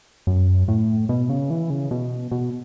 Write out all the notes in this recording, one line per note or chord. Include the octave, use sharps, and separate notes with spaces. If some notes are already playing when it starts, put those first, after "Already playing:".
F#2
A2
B2
C#3
E3
C#3
B2
B2